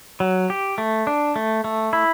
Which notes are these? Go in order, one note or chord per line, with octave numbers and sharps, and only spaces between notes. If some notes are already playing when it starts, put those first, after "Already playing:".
F#3
G4
A3
D4
A3
A3
E4